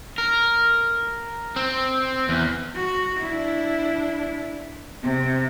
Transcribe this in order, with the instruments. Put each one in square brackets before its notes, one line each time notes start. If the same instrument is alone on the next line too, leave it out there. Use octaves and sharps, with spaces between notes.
[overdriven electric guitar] A#4
C4
E2
[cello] F#4
D4 E4
C3